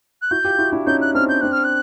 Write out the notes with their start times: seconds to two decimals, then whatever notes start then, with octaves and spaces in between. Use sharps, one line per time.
0.22 F#6
0.31 E4 F#4 G6
0.45 F4 G4
0.59 E4 F#4
0.72 D4 E4
0.87 C#4 D#4 G6
1.01 F#6
1.15 C4 D4 F6
1.29 G6
1.41 C4 D4 F#6
1.52 F6
1.64 F#6